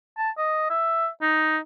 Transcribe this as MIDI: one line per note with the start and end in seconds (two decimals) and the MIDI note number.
0.18 0.30 81
0.38 0.67 75
0.70 1.08 76
1.22 1.58 63